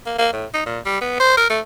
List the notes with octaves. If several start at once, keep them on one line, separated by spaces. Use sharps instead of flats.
A#3
A#3
A2
D#4
A#2
G3
B3
C5
A#4
A3